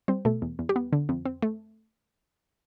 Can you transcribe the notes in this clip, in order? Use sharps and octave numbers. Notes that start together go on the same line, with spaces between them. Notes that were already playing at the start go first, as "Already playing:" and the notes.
G3 C4 C5
B2 A3 A4
E2
E2
G3 G4
B3
D3
F2
C4
A3